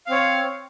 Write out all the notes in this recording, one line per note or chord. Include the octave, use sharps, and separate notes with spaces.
C4 C#5 F5